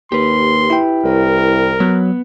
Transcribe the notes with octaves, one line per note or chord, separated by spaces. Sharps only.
D#2 G4 B4 C6
E4 G5
C2 A#4
F#3 B3